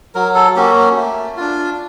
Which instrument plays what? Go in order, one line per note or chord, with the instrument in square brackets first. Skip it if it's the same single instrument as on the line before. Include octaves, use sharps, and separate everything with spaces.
[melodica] F#3 A#4
A4
A#3 C#4 F#4 G4
A3
D4 F4